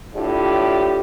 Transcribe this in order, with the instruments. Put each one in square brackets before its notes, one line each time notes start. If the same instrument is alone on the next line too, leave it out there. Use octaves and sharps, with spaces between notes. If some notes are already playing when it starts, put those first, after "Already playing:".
[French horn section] A2 D4 E4 F4 G4